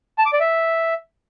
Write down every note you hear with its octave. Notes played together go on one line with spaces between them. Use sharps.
A5
D6
D5
E5